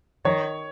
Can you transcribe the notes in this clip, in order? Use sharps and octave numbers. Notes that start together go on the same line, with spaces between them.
D#3 C#5